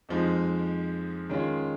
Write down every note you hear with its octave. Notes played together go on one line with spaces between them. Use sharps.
F2 F3 G#3 D#4
D#3 G#3 C#4 F4